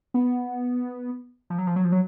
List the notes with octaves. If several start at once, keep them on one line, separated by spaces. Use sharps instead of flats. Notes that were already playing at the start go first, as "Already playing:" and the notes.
B3
F3
F#3
F3
F#3
F3
F#3